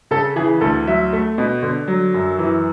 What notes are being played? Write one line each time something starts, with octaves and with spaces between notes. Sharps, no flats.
C#3 A4
E3 G#4
D2 A4
F#3 E5
A3
B2
D3
F#3
F#2
E3